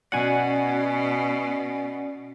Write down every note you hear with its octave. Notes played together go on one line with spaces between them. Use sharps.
B2 C#4 F#4 D5 F#5 G#5